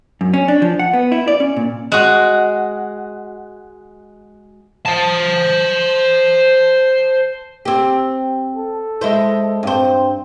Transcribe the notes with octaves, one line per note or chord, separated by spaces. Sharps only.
F#2
C#4
D4
F3
F#5
B3
E4
D5
C#4
A#2
G#3 F#4
C5 A5
C4 G4
A4
G#3 E4 C5
G2 C4 C5